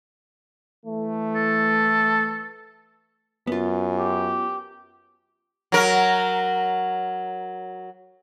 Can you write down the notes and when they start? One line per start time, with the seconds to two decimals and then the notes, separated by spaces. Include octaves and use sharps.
0.85 E3 A3
1.35 A4
3.47 F#2 B3 F4
3.97 G4
5.72 F#3 A#4